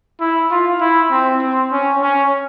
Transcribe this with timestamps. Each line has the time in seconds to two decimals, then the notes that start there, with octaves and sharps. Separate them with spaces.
0.20 E4
0.51 F4
0.81 E4
1.11 C4
1.42 C4
1.72 C#4
2.02 C#4